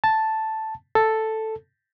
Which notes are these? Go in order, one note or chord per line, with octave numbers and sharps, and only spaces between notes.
A5
A4